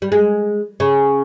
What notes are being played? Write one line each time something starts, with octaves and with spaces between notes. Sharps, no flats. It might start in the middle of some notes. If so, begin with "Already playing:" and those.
G3
G#3
C#3